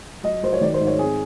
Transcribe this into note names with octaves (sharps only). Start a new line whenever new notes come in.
F#3 D#5
F#3 C5
C#5
D#3 D5
C5
G#2
C#5
C4 G#4